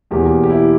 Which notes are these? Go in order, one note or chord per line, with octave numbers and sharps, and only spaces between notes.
E2 B2 A#3 G4
G4
E4